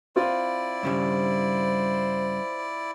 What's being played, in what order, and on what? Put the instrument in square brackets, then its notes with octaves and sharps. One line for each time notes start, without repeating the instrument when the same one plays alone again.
[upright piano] C4 F4 [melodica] E4 D5
[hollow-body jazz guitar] G2 C#3 G3 [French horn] C5